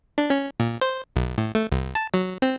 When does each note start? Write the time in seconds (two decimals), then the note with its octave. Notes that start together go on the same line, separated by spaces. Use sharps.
0.18 D4
0.30 C#4
0.60 A#2
0.81 C5
1.16 B1
1.38 A2
1.55 A3
1.72 C2
1.95 A5
2.14 F#3
2.42 C4